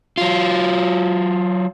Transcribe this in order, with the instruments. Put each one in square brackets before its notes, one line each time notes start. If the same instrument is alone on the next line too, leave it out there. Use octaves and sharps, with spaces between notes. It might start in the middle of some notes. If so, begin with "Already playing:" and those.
[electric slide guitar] F#3 F4